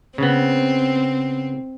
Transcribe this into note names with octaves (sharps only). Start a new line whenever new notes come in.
C#3 B3 C4